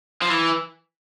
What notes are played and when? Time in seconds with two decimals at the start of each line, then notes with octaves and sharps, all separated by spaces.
0.22 F3
0.30 E3